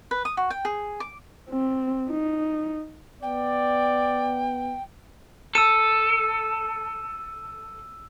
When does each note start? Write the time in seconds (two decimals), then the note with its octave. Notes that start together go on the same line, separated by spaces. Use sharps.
0.11 B4
0.25 D#6
0.37 F#4
0.50 G5
0.65 G#4
1.00 D6
1.49 C4
2.09 D#4
3.23 B3 D5 G5
5.55 A4 E6 D#7